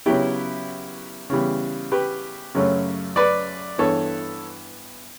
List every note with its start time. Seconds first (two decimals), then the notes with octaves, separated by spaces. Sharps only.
0.06 C#3 F#3 B3 E4 G4
1.30 C#3 E3 G3 B3
1.92 G4 B4
2.54 F#2 C#3 F#3 A3 C#4
3.16 B4 D5
3.78 G2 E3 B3 A4 C#5